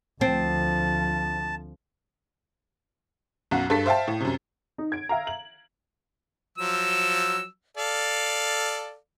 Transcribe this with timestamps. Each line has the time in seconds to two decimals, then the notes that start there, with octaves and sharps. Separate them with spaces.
0.21 D2 F3 C4 A5
3.51 B1 F#2 F#4
3.70 G2 A4 B6
3.86 C5 E5 F5 G5 A5
4.07 A2
4.21 F#2 C3
4.78 D#4
4.92 G#6 D7
5.09 E5 F5 A#5
5.27 F#7
6.58 F3 F#3 E6
7.77 A4 D5 F5